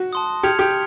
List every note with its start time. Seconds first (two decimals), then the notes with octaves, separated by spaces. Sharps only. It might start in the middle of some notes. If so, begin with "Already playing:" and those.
Already playing: F#4
0.13 A5 C6 D#6
0.43 G4 F6 G#6 C#7 F7
0.59 G4